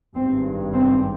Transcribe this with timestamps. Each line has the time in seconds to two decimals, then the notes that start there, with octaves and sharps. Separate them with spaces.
0.15 G#1 G2 C4
0.74 C4